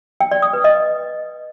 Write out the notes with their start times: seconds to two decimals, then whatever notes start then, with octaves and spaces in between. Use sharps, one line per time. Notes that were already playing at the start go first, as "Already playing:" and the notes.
0.21 G5
0.31 D5
0.42 D#6
0.53 B4
0.64 D#5